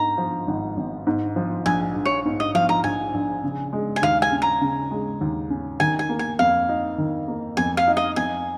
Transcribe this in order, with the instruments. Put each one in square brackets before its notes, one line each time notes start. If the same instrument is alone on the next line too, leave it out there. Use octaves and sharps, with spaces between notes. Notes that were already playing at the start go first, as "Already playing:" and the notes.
Already playing: [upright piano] G#2 [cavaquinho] A#5
[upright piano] F3
G#1
G#1
G#2
F3
[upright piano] A#1 [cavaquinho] G#5
[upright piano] A#1
[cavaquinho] C#5
[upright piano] G#2
[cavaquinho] D#5
[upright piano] F3 [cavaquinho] F5
[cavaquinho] A#5
[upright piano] A#1 [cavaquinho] G#5
[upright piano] A#1
C#3
G#3
[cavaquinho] G#5
[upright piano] D#2 [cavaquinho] F5
[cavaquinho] G#5
[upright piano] C#4
[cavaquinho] A#5
[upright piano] C#3
G#3
D#2
C#4
[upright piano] D#3 [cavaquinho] G#5
[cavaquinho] G#5
[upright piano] A#3
[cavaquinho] G#5
[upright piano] F2 [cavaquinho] F5
[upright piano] D#4
D#3
A#3
[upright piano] F2 [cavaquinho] G#5
[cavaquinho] F5
[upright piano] D#4
[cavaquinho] D#5
[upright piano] F2 [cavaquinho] G#5